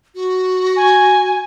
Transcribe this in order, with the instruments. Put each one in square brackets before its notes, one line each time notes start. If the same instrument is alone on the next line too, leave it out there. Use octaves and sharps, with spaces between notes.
[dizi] F#4
[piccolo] G#5